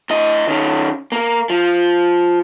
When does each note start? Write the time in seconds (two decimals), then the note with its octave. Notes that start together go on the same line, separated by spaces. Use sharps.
0.10 A2 D#5
0.47 D#3 C#4
1.12 A#3 A#4
1.50 F3